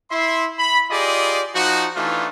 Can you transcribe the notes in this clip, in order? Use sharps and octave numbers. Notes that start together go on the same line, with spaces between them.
E4 E5 C6
B5
F4 G4 G#4 D5 D#5
F3 D#4 F#4
E3 A3 D4 D#4 F4